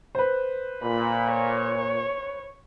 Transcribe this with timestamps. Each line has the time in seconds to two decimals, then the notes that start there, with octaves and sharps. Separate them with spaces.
0.15 B4 C5
0.82 A#2 B5
1.32 C#5